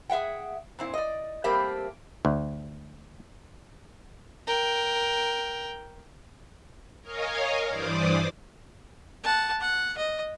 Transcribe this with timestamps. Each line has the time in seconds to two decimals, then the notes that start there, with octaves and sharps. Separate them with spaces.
0.10 G#4 E5 F#5 G5
0.79 A#2 C4 E4
0.94 D5 D#5
1.44 G3 A3 A#3 C4 G4 E5
2.25 D2
4.47 A#4 G5
7.02 A#4 C#5 D#5 F5 G#5
7.68 G2 E3 C5 D5 D6 D#6
9.24 F#5 A5
9.61 F#5
9.97 D#5